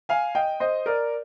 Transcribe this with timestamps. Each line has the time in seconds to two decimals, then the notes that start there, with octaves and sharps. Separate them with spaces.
0.09 F5 G#5
0.35 D#5 G5
0.60 C5 D#5
0.86 A#4 D5